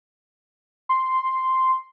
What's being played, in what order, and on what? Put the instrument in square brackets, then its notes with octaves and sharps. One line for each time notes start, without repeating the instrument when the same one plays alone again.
[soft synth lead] C6